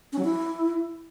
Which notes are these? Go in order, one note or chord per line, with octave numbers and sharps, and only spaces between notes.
C#4
F#3
E4